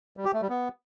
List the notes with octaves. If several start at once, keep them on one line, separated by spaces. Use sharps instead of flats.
G3
G4
A3
G3
B3